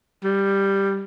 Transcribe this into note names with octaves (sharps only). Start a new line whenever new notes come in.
G3